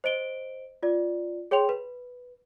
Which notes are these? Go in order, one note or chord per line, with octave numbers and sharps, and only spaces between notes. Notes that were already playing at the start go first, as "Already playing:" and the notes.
C5 D#5 D7 G7
F4 D5
G#4 C#5 G5 C6 F7
B4